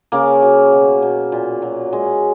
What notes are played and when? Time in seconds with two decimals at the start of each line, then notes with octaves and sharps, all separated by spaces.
0.12 C#3 A#3
0.42 F#3
0.72 B2
1.02 B2
1.32 A#2
1.62 F#3
1.93 G#3